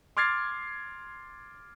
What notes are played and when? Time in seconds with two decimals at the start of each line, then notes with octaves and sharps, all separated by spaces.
0.17 C6 D6 F6 G#6 A6 C7